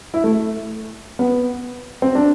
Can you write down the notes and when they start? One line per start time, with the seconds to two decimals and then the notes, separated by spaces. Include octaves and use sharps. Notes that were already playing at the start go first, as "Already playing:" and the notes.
0.14 E4
0.24 A3
1.19 B3
2.02 C4
2.15 D4